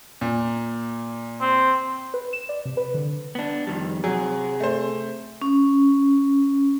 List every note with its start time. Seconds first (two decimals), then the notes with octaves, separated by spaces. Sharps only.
0.21 A#2
1.41 C4
2.14 B4
2.33 E7
2.49 D5
2.65 C3
2.77 B4
2.94 D3
3.35 B3 D4
3.67 F2 D#3 G3
4.04 C3 F#3 G#4
4.60 A3 C5
5.42 C#4